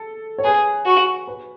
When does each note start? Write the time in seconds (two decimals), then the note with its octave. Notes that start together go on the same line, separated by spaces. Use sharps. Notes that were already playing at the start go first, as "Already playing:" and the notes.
Already playing: A4
0.38 C#5
0.44 G#4 B4
0.85 F#4
1.28 B4